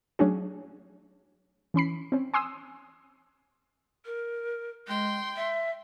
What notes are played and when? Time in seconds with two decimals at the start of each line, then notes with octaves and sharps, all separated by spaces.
0.19 F#3 A3 C#4 D4 F#4 G#4
1.74 E3 C#4 B5 C7
2.12 C4 C#4
2.34 G#5 C6 D#6 E6
4.06 A#4
4.88 G#3 G5 C6
5.36 E5